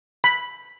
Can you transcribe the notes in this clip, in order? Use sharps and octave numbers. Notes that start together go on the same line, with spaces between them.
B5